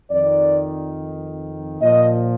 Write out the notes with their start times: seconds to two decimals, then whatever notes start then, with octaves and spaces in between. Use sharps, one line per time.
0.11 F2 D#3 D5
1.82 A#2 F3 D#5